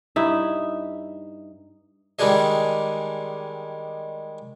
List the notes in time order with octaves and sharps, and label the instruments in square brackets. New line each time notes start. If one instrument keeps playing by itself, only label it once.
[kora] G2 D#4 E4 E5
[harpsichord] D#3 G3 G#3 D4 G#4 D#5